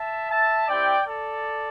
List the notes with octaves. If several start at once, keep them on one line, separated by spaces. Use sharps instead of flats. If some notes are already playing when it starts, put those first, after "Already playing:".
Already playing: E5 A5
E5 A5
C4 E4 G4 D5 G5
A4 D5